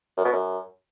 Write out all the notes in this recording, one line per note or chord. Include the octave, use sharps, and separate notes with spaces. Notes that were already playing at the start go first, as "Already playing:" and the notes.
F#2
B2
F#2